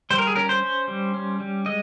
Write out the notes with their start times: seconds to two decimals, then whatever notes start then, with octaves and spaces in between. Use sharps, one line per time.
0.10 G3 C5
0.18 A#4
0.27 G#4
0.36 C#4 A#4
0.49 C5
0.62 C#4
0.88 G3
1.14 C#4
1.40 G3
1.66 G#3 D#5